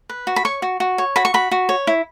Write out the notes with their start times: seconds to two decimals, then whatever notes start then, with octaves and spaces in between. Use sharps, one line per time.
0.10 B4
0.27 F#4
0.36 B5
0.45 C#5 C#6
0.62 F#4
0.80 F#4
0.98 C#5
1.16 F#4 B5
1.25 C#6
1.34 F#4 B5
1.51 F#4
1.69 C#5
1.87 E4